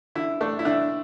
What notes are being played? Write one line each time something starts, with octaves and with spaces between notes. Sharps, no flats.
D3 E4
A3 D4
E4
D3 D4